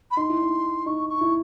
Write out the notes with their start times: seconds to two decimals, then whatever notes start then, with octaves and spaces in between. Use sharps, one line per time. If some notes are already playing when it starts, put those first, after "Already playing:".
0.11 B5
0.17 D#4 C6
0.29 E4
0.43 D#4
0.86 D#4 C#6
1.09 C#6
1.21 E4